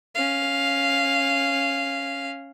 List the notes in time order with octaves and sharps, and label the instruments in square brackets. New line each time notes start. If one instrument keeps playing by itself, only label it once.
[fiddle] C#4 F5